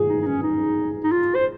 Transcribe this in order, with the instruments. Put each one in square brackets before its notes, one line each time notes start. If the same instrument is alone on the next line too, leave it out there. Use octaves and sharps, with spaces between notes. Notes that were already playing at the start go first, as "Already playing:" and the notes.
Already playing: [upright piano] G#4
[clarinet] D#4
D#4
C#4
D#4
D#4
F4
C5